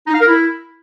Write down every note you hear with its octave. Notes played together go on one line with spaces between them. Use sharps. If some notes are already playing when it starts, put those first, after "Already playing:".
D#4
F5
A#4
E4